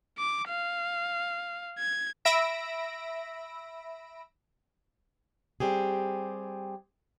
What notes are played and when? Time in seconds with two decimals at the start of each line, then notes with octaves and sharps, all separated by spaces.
0.19 D6
0.49 F5
1.79 G#6
2.25 E5 B5 E6 A#6 D7
5.60 G3 C4 G4 G#4